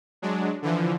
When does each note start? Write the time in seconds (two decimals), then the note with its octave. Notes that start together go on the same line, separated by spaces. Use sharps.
0.22 F#3 G#3 D4
0.62 D3 E3 F3